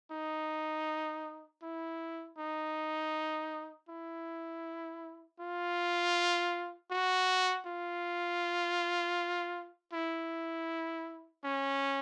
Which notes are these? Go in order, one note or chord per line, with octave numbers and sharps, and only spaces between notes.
D#4
E4
D#4
E4
F4
F#4
F4
E4
C#4